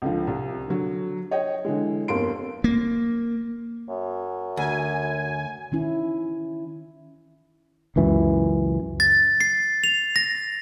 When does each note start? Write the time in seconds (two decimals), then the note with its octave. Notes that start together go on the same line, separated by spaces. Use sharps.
0.02 C#2 D3 F3
0.27 C2
0.68 D3 F#3
1.31 C#5 D#5 G5
1.65 D3 E3 G#3
2.08 G1 F2 A#3 C6 D7
2.64 A#3
3.89 F#2
4.57 D2 G#5
5.72 D#3 C#4 E4
7.96 C#2 F#2 E3
9.00 A6
9.41 C7
9.84 F7
10.16 A#6